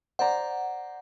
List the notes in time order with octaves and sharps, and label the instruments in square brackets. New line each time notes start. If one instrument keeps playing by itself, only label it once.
[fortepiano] C5 D5 A#5 [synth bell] F#5